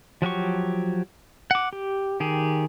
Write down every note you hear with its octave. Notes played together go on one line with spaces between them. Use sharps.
F3 F#3 G4 C#6
F#5 D6
G4
D#3 G4 G#4